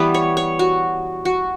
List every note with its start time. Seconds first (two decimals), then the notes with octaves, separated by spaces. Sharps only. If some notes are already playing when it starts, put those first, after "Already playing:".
Already playing: E3 G3 B3 B4
0.14 C#5
0.37 C#5
0.59 F#4
1.25 F#4